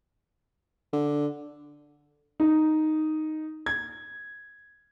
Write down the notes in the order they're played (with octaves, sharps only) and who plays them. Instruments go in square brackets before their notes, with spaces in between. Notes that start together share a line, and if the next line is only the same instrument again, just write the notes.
[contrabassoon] D3
[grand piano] D#4
G#6